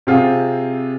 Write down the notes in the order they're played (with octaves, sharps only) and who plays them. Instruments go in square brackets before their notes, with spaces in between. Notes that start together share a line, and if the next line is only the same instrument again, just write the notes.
[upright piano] C3 C4 F4 G#4